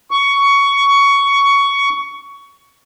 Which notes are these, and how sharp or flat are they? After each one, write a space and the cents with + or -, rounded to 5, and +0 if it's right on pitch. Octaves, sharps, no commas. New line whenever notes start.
C#6 +15